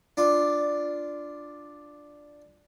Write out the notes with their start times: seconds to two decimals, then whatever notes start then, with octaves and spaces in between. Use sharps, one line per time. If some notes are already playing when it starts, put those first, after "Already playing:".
0.17 D4 F4